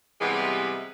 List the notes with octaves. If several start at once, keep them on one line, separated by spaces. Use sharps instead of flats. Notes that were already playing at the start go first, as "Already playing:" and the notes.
C3 E3 G3 G#3 B3